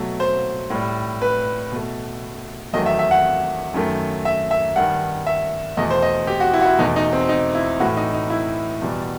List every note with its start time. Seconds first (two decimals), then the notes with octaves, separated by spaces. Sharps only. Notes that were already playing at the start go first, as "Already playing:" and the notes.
Already playing: B2 F#3 A3
0.20 C5
0.70 A2 G3
1.22 B4
1.72 B2 A3
2.73 E2 D#3 F#3 A3 D#5
2.86 E5
2.99 E5
3.11 F#5
3.74 F#2 D#3 A3
4.25 E5
4.51 E5
4.76 G2 D#3 G3 F#5
5.27 E5
5.77 E2 B2 A3 D#5
5.91 C5
6.02 D#5
6.27 G4
6.40 F#4
6.54 E4
6.61 F#4
6.66 E4
6.79 E2 B2 A3 D#4
6.96 D#4
7.13 C4
7.29 D#4
7.55 E4
7.80 A2 E3 A3 F#4
7.97 D#4
8.13 D#4
8.30 E4
8.82 E2 B2 G3